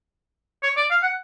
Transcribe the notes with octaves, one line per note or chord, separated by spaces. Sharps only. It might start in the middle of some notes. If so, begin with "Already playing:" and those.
C#5
D5
F5
F#5